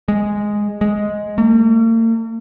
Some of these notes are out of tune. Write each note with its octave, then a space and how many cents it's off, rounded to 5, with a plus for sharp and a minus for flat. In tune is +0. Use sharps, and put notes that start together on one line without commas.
G#3 -5
G#3 +5
A#3 -45